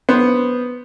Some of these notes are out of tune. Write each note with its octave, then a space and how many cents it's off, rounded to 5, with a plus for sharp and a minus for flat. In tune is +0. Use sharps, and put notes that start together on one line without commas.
B3 +0 C5 +0